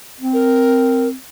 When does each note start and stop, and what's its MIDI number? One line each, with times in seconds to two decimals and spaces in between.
0.20 1.14 60
0.33 1.08 70